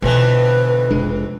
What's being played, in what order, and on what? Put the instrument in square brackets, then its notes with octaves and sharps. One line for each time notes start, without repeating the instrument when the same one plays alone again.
[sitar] F2 E3 [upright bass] B2 D3 [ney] B4
[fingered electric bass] F1 G#3 D4